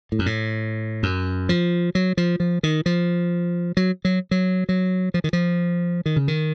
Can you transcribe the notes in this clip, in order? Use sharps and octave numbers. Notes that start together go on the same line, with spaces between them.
A2
F#2
A2
F#2
F3
F#3
F3
F3
D#3
F3
F#3
F#3
F#3
F#3
F3
D#3
F3
D#3
C#3
D#3